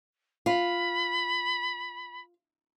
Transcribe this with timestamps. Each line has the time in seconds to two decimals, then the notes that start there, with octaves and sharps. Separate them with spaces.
0.46 F4 B5